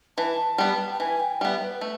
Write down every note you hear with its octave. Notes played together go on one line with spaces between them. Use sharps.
E3 A5
G3 B3
G5
E3 G#5
G5
G3 B3 E5
B4
A3